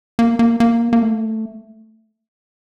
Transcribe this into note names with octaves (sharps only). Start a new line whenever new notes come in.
A#3
A#3
A#3
A#3
A3